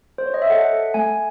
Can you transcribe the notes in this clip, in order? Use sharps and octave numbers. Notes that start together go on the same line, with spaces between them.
C5
C#5
D#5
E5
A4 F#5
A4
A3 G#5